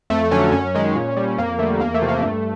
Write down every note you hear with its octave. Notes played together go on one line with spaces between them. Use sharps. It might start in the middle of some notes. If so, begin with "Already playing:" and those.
F2 A3
D3 F#3 C#4
F#2 C#4
D#3 G#3
A#2
G3
F2 A#3
D3 G3 A3
E2 A#3
A3
C3 F3
A#3
G2 A3